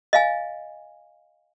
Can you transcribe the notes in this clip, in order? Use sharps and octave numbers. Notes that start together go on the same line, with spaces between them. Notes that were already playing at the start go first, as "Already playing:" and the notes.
D#5 F5 G#5